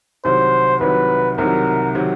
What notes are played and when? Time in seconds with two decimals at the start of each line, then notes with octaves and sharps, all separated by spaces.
0.24 C2 C3 D#3 F#3 C5
0.81 C2 C3 D#3 F#3 B4
1.38 C2 C3 D#3 F#3 A#4
1.95 C3 D#3 F#3